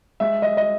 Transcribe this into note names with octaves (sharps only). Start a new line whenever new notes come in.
G#3 E5
D#5
D#5